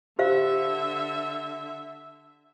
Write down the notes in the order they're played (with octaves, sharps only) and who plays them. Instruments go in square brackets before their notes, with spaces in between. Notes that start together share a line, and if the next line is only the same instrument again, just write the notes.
[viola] D3 E5 [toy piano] G4 C5 F5